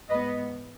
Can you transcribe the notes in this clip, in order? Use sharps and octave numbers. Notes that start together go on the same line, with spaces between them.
G#2 E3 B3 B4 D#5